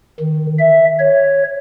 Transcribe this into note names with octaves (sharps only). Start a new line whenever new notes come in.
D#3
E5
C#5